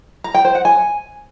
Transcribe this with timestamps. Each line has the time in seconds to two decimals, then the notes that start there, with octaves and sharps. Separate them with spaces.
0.24 A#5
0.34 G5
0.45 C5
0.55 F#5
0.65 G#5